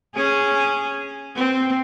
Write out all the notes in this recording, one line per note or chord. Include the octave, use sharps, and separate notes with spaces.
C#4 G#4
C4